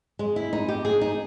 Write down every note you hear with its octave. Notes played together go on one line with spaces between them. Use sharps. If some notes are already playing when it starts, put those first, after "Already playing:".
G#3
E4
D#4
G4
G#4
D#4